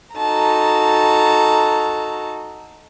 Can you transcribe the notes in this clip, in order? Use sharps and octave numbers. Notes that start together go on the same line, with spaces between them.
D#4 F#4 A4 A5 A#5